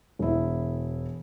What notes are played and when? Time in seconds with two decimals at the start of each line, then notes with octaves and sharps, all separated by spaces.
0.19 E1 E4